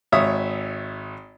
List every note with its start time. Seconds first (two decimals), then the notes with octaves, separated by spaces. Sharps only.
0.12 G#1 C#5 E5 D#6